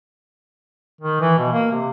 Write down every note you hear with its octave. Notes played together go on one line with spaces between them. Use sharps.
D#3
E3
B2
A#3
C3